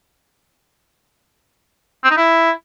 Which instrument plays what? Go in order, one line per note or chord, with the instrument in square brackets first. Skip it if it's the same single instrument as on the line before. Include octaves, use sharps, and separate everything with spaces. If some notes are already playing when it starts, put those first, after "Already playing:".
[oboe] C4
D#4
E4